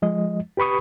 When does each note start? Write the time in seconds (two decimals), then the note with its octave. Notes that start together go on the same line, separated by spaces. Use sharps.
0.02 F3 G#3 D#5
0.57 G4 B4 B5 C#6 D#6